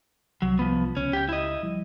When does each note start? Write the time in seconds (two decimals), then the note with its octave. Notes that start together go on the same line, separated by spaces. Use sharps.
0.42 C2 F#3
0.59 F3 B3
0.97 C#2 C#4
1.13 G4 G5
1.29 E4 D#5
1.63 F3 G3